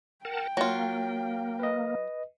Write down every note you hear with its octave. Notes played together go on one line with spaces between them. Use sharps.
A#4 F#5 G5 A5
F#3 A#3 F4
B4 D#5